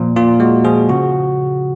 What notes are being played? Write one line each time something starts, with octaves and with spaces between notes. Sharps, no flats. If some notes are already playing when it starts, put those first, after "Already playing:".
Already playing: A#2 F3
A#2 F4
G#3 F#4
F3 G#4
C#3 F#4